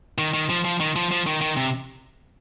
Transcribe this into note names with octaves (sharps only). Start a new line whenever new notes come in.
D#3
D#3
F3
F3
D#3
F3
F3
D#3
D#3
C3